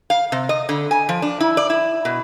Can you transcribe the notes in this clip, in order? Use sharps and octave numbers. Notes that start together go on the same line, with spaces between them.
F5
C3
D#5
D3
G#5
F3
D4
E4
D5
E4
B2